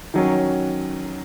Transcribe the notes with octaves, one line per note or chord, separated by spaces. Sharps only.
D#3 F#3 C#4